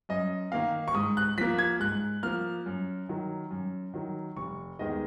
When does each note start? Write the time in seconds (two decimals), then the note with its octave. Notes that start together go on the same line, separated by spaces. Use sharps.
0.09 F#2 D#5
0.52 D#3 A#3 D#4 F5
0.88 C#6
0.95 G#2 D#6
1.17 F#6
1.38 F3 A#3 B6
1.58 G#6
1.80 G#2 F#6
2.23 F3 A#3 F6
2.66 F#2
3.09 D#3 F#3
3.51 F#2
3.94 D#3 F#3
4.36 F1 C#6
4.79 D#2 D#3 G#3 B3 D#5